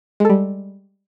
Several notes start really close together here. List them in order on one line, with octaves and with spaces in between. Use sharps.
G#3 A4 G3